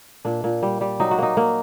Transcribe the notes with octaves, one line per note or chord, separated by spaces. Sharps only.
A#2 D4
A#2
G3
G3
F#3 D#4
F#4
A#3 D#4
A#3